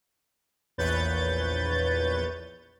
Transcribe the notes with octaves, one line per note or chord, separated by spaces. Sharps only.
A#1 E2 B4 C#5 G6 A6